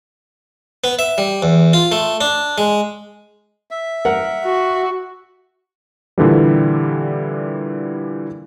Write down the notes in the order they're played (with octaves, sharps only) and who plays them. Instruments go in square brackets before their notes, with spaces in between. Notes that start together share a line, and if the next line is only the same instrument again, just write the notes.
[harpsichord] B3
E5
G3
E2
F4
A3
D4
G#3
[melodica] E5
[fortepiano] A#4 F#5
[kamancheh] F#4
[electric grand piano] A#2 D3 E3 G3